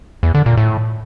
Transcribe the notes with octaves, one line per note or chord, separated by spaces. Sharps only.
E2
D3
A#2
A2